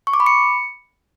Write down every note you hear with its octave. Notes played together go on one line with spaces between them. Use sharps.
C#6
D6
B5
C#7